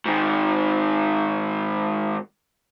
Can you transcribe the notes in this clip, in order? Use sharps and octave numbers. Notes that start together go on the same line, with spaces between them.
G#2 D#3